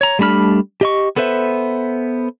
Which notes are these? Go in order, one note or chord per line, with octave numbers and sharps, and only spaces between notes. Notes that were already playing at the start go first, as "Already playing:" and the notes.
C#5 A#5
G3 A3 D4 B5 F6
G4 D#5 C#6
B3 A4 B4 C5 E5